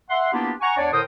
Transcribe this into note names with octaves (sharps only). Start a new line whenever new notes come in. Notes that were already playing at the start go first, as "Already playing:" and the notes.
E5 F#5 C6
A#3 B3 D4 E4 F4 G4
F#5 G#5 A#5 C#6
E2 D4 C#5 D5
A2 D3 A#4 C5 G5 D#6